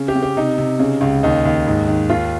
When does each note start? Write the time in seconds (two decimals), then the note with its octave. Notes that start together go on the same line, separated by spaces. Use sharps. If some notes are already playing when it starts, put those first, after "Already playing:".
Already playing: C#3
0.08 G4
0.15 C#3
0.23 G4
0.37 C3 D#4
0.58 C3
0.79 C#3
1.01 C#2
1.23 D#2 D#4
1.45 D#2
1.67 G#2
1.88 D#3
2.09 D#2 F4